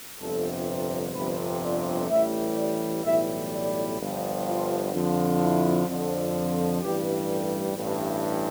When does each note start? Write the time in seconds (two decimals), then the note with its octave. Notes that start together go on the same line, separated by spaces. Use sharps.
0.20 G1 F2 C3 A4
1.15 G1 F2 C3 B4
1.62 D5
2.09 A1 A2 E3 G3 E5
2.56 D5
3.04 B1 A2 E3 G3 E5
3.52 D5
3.99 G1 G2 F3
4.46 F4
4.93 F2 D3 F3
5.41 E4
5.87 F2 D3 F3
6.82 A1 G2 E3 G3 G4
7.29 A4
7.77 A1 G2 E3